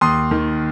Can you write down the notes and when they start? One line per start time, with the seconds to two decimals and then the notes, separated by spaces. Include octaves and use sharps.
0.01 D#2 C6 D#6
0.31 D#3